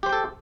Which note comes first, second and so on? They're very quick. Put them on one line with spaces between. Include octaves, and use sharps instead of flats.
G4 C5 G5 A4